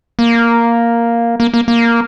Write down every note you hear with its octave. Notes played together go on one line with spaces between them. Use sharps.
A#3
A#3
A#3
A#3